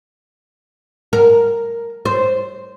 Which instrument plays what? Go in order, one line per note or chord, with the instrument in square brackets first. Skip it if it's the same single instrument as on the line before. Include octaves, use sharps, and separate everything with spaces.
[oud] A#4
C5